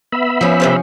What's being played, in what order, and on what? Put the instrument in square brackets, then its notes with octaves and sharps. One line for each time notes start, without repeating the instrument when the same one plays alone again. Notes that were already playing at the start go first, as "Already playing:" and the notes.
[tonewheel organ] B3 E5 B5
[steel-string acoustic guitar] F3 C#4
[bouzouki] C3 G3 C5